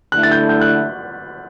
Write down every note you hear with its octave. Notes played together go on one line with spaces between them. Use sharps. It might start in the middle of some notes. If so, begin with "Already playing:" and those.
D3 A3 E4 F#6
A6
G6
G6
F#6